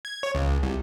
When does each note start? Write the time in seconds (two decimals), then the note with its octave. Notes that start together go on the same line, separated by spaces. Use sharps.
0.05 G#6
0.23 C#5
0.35 C#2
0.63 C2